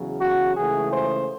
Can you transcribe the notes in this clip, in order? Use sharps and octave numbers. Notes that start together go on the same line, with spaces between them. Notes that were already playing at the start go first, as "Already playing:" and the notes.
Already playing: E2 C#3 F#3
F#4
C#2 C#3 E3 A3 G#4
C5